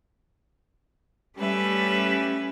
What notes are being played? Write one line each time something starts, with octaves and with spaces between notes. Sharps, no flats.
G3 A3 C#4 G4 B4 E5